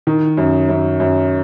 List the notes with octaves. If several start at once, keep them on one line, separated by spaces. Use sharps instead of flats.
D#3
F#2
F#2
F#2